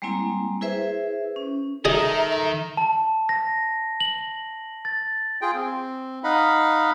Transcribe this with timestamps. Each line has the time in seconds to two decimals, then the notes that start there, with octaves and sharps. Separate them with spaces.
0.02 G3 G#3 A#3 C4 E4
0.61 E4 G#4 B4 C5 E5
1.36 C#4
1.85 D#3 G#4 A4 D#5 E5 A#5
2.77 A5
3.29 A#6
4.00 F#7
4.85 A6
5.41 F4 G#4 G5
5.54 C4
6.24 D#4 D#5 F5 F#5 B5